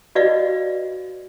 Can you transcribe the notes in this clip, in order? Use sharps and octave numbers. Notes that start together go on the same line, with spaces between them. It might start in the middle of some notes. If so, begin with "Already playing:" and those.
F#4 B4 D5 D#5 F5